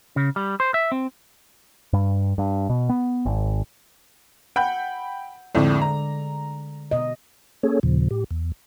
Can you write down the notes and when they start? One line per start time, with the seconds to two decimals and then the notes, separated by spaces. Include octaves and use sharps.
0.16 C#3
0.36 G3
0.60 C5
0.74 E5
0.92 C4
1.93 G2
2.38 G2
2.69 B2
2.89 B3
3.26 G#1
4.56 F#5 G5 B5 G6
5.55 F2 A2 D3 G#3 D5
5.82 A#5
6.91 B2 D#5
7.63 A#3 C#4 G#4 A4 C#5
7.83 D#2 A#2 C#3 F3
8.11 A2 G4
8.31 E2